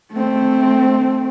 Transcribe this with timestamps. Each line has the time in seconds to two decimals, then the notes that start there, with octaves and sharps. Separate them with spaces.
0.13 A3 C4